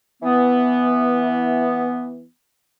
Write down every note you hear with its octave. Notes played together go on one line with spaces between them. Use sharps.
E3 B3